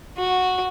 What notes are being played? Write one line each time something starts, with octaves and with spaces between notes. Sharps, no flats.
F#4